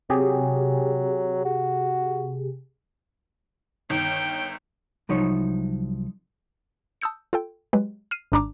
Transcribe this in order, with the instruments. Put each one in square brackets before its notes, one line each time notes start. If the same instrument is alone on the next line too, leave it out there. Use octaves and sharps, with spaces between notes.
[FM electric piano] C3 G4 G#4 [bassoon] F#3
[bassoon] F#4
[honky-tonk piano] G1 D#3 [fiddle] G5
[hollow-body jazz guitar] C2 F3 F#3 D#4 C#5
[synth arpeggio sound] A5 D#6 E6 G6 C#7
F4 A4 G5
F#3 G#3 G4 B4
F6 C7 D#7
G#1 G#2 D4 D5 A#5 D6